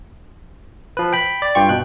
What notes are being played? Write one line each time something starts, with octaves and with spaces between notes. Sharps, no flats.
F3 B4
G5 B5
D5
G2 F4 G5 C#6
B2 F#6